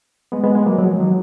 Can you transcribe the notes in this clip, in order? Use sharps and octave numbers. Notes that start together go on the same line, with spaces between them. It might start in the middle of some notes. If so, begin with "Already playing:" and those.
G#3 B3
G#3 B3
G#3 B3
F#3 A#3
F#3
F3 G#3
D#3 F#3